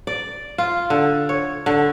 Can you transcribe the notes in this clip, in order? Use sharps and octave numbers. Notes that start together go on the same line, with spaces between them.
D5
F4
D3
C#5
D3